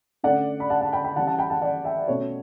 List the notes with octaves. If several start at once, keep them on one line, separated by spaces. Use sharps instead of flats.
D3 A3 C#4 D5 F#5
B5
F#5 A5
F#5 A5
G5 B5
G5 B5
E3 G3 C#4 F#5 A5
F#5 A5
G5 B5
F#5 A5
D5 F#5
E5 G5
B2 A3 C#4 C#5